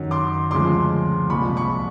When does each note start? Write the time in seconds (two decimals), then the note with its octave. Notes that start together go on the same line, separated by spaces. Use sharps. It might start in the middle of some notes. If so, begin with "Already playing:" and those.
Already playing: F#2 D#3 F#3
0.11 C6 D6
0.51 D2 C#3 F3 G#3 C6 D6
1.30 C2 A#2 F3 G#3 B5 C#6
1.57 B5 C#6